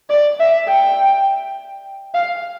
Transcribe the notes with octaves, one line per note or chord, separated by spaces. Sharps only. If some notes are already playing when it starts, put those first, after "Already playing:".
D5
E5
G5
F5